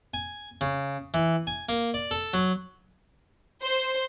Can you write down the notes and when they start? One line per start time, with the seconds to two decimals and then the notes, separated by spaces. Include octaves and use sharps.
0.14 G#5
0.61 C#3
1.14 E3
1.47 G#5
1.69 A#3
1.94 D5
2.11 A4
2.34 F#3
3.61 C5